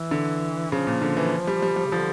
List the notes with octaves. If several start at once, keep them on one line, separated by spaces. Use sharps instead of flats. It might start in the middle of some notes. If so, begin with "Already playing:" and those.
Already playing: E3
D3
C#3 F3
A#2
D3
E3
G3
G3
G3
C#3
D3 F3